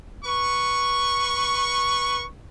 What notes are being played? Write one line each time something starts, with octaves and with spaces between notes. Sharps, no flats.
B4 C#6